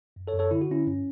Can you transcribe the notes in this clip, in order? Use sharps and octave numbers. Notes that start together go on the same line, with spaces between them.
F#2
A4 C#5
F#2
A4 C#5
D3 E4
F#4
D3 C#4 E4
G2 C#4